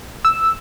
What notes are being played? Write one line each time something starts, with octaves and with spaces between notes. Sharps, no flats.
E6